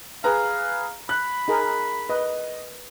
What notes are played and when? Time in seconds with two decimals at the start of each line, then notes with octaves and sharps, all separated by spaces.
0.24 G#4 B4 F5 A#5
1.09 B5 F#6
1.48 D#4 G#4 A#4
2.09 B4 D#5